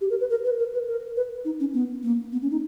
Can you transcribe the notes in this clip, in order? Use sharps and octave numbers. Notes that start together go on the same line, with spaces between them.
G4
A#4
B4
A#4
B4
A#4
B4
A#4
B4
D#4
C#4
B3
A#3
B3
C#4
D#4